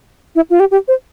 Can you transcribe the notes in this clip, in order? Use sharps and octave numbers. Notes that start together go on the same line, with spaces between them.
E4
F4
G4
G4
C5